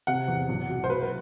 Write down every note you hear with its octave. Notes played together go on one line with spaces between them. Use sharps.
C3 F#5
E2
B1
F#3
C5
F#3 B4
B4